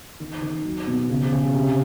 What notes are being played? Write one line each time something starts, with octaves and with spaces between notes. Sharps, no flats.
D#3
D#3
F#3
B2
C#3
C#3
C3